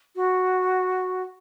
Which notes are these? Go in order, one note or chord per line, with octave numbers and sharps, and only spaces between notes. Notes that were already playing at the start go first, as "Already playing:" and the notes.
F#4